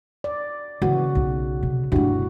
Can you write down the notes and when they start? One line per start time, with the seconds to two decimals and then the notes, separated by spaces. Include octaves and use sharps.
0.24 D5
0.82 C#3 E3 A#3 F#4
1.15 B1 B2
1.63 C3
1.92 G2 A3 E4 F#4 G4